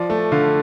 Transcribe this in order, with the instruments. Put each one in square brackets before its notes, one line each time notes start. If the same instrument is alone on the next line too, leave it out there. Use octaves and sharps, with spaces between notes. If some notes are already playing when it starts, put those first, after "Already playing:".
Already playing: [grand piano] F3 D5
A3
D3 F5